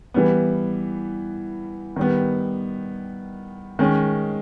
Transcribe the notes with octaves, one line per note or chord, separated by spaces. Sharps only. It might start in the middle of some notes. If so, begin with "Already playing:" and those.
E3 G3 B3
D#3 G3 B3
D#3 G#3 C#4